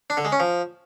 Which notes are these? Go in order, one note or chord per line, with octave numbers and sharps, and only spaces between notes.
D4
D3
G#3
C#4
F3